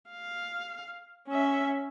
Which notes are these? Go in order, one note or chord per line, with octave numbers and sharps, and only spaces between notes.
F5
C#4 E5